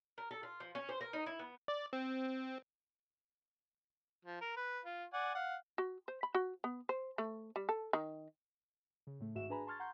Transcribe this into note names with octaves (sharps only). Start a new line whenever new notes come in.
A#4
A4
F4
F3
C#4
C5
A#4
D#4
E4
B3
D5
C4
F3
A#4
B4
F4
D5 F#5 G#5
F5 F#5
F#4
C5
B5
F#4
B3
C5
A3
G3
A4
D#3
C#3
A2 A3
G#1 G#2 F#4 E5 E7
D4 G#4 B4 G#5 A#5 B5
A5 C6 C#6 F6 G#6 A6
F#5 A#5 C6 C#6 G6